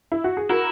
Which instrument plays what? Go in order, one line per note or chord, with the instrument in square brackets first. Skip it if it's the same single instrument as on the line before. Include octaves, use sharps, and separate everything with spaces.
[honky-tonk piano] E4
F#4
G#4
[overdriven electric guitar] E4 [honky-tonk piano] F#4 A#4